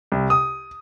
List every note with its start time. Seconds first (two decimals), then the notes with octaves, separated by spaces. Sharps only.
0.12 C2
0.30 D#6